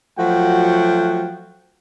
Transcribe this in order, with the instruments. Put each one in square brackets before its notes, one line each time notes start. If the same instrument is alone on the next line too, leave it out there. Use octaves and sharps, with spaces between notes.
[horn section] F3 F#3 A3 F#4 F#5 G5